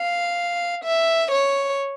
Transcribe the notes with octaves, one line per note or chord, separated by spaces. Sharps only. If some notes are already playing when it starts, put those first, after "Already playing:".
Already playing: F5
E5
C#5